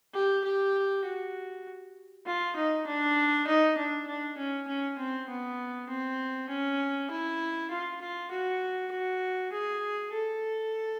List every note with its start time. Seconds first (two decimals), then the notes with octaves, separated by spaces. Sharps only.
0.14 G4
0.44 G4
1.04 F#4
2.26 F4
2.56 D#4
2.86 D4
3.47 D#4
3.77 D4
4.07 D4
4.37 C#4
4.67 C#4
4.98 C4
5.28 B3
5.89 C4
6.49 C#4
7.10 E4
7.70 F4
8.01 F4
8.31 F#4
8.92 F#4
9.52 G#4
10.12 A4